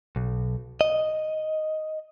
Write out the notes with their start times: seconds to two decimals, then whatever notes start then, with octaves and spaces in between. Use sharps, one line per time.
0.16 B1
0.81 D#5